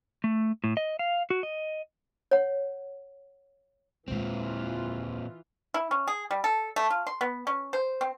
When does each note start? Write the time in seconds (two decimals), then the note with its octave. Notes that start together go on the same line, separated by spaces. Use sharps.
0.24 A3
0.64 A2
0.77 D#5
0.99 F5
1.30 F#4
1.43 D#5
2.31 C#5 F#5
4.08 D#1 A#2 E3 G#3 C4 F4
5.74 E4
5.91 C#4
6.07 G#4
6.31 G3
6.44 A4
6.76 A3
6.90 F4
7.07 C6
7.21 B3
7.47 C#4
7.73 C5
8.01 C4